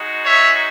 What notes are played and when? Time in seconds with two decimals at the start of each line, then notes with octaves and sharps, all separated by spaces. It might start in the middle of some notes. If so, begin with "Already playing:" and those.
Already playing: G#3 D#4 F#4
0.23 C#5 E5